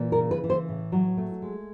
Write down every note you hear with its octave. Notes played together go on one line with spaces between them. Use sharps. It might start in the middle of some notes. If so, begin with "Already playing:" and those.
Already playing: A#2 E3
A#4
C#3
B4
E3
C5
A2
F#3
A3
G#3